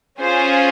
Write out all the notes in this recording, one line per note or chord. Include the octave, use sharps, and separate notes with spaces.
C#4 F4 G#4 C5